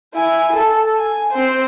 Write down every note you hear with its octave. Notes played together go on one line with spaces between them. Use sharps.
E4 G#5
A4
G#5
C4 C5